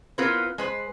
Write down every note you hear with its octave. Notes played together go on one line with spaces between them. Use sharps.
B3 C4 E4 F4 A#4 B4
G#3 B4 C5